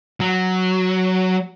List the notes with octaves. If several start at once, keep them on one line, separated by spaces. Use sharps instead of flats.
F#3